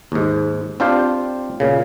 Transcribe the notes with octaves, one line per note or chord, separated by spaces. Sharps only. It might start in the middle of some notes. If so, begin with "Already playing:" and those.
D#2 G#2
C4 D4 F4 G4 C5
A#2 C#3